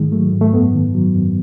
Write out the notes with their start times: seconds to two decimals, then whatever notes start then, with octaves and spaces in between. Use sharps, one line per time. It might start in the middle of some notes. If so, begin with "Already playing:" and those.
Already playing: G#2 D#3 G#3
0.12 F#3 A3
0.33 G#2
0.41 A3
0.53 F#2 B3
0.73 D#3
0.94 F#3
1.15 F#2